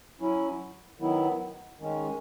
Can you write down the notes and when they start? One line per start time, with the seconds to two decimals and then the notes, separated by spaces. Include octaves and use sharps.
0.20 F#3 C#4 E4
0.99 D#3 F#3 B3 E4
1.80 D#3 G#3 C#4